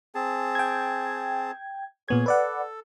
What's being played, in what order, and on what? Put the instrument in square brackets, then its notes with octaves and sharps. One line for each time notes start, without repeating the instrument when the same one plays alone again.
[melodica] C4 G#4 A5
[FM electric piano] G5 G#6
[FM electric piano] A#2 B3 G#6 [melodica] G#4 C#5
[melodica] A4 [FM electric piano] B4 D5 F#5